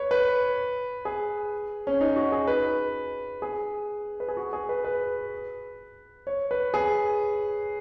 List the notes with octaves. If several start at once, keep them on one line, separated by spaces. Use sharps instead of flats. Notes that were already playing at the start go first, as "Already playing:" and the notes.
Already playing: B4 C#5
B4
G#4
C#4
D#4
F#4
G#4
B4
G#4
B4
G#4
F#4
G#4
B4
B4
C#5
B4
G#4